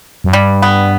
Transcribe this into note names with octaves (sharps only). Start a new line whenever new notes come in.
F#2
G2 G3
B3